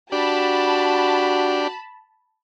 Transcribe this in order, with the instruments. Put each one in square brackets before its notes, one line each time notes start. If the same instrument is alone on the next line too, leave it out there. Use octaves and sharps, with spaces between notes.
[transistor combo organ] D4 G4 D5 [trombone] F#4 [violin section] A5 B5